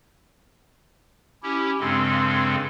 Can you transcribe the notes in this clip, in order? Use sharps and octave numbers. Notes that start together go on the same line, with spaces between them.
C#4 E4 G4
G2 C#3 G#3 C4 A4 C6